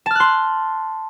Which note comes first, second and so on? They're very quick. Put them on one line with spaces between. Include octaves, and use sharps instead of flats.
A5 F6 F#6 C6